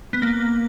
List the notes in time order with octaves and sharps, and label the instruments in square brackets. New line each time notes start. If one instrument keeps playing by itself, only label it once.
[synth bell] B3
A#3